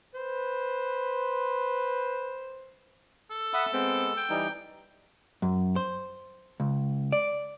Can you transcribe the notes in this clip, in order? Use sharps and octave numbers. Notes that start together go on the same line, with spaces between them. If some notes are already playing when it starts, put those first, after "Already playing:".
B4 C5
A4
E5 F#5 B5 D#6
G#3 B3 C4
G5
E3 G3 D#4
F#2
C5
C#2
D5